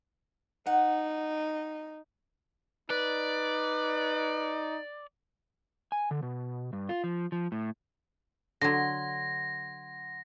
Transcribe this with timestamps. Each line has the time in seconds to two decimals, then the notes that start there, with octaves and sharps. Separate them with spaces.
0.67 D#4 F#5
2.90 D#4 B4 D5
5.92 G#5
6.11 D3
6.23 B2
6.73 G2
6.89 F4
7.04 F3
7.32 F3
7.52 A2
8.62 D3 F#3 F#5 C6 G#6 A#6